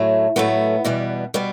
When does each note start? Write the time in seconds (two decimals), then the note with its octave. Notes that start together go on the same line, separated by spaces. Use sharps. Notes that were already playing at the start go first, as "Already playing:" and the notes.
Already playing: A2 F#3 A3
0.36 A2 F#3 A3 B3
0.84 E2 B2 G3 B3
1.34 B2 G3 B3